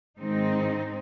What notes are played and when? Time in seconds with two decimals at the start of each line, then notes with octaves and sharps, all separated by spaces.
0.18 G#2 D#3 G#3 C4 D#4